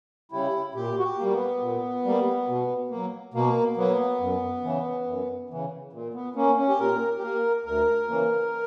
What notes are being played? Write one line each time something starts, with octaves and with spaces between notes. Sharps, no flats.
C#3 G3 E4
A#2 G4
F#4
G4
G3 A#3
B3
A#2
G3 A#3
B2
F#3 A#3
B2 A#3
F#3 A#3 B3
F#2
C#3 E3
F#2
C#3 E3
A#2
B3
A#3 C#4
C#4
G4
A#2 A#4
G4
A#3 A#4
D2 A#4
C#3 E3 A#3